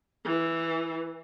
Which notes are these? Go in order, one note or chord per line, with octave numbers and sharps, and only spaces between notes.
E3